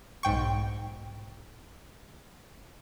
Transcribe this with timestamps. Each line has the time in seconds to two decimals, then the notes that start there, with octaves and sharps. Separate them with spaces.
0.23 B1 G#2 G5 C#6